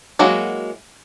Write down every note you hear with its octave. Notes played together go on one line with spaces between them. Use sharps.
F#3 G#3 A#3 E4 F#4